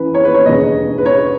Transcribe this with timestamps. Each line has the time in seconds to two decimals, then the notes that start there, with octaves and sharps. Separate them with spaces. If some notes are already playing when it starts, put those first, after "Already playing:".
Already playing: F#1 F#2 E3 B4
0.14 C#5
0.25 B4
0.34 C#5
0.46 E1 D#2 C#3 D#5
0.98 B4
1.06 C#5